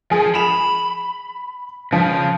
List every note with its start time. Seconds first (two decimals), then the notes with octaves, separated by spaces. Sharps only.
0.11 F3 G#4
0.35 B5 E7 F7
1.92 C#3 F3